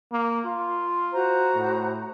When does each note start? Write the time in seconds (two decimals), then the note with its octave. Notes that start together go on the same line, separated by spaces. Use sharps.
0.12 A#3
0.46 F4
1.12 F#4 C5 A#5
1.55 A2